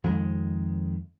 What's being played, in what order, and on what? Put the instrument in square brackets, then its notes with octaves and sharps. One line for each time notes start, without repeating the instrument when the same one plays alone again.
[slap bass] F2 D#3 G#3